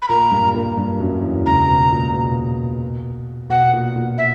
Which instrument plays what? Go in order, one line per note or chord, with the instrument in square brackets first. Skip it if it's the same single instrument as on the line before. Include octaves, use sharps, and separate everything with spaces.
[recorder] B5
[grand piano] A#2 A#3 [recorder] A#5
[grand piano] G2 G3
A#2 A#3
G2 G3
F#2 F#3
E2 E3
[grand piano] C#2 C#3 [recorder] A#5
[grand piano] B2
A#2
B2
[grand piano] B2 [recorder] F#5
[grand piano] A#2
A#2
[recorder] E5